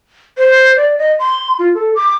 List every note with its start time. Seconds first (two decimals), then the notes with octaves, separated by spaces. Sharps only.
0.38 C5
0.77 D5
0.98 D#5
1.19 C6
1.59 F4
1.74 A4
1.95 D6